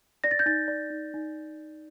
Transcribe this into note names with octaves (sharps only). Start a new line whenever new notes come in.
D5 A#6
A6
G6
D#4 A6
D5
D#4
D#4